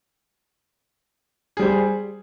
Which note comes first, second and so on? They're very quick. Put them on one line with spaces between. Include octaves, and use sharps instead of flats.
G#4 G3 C5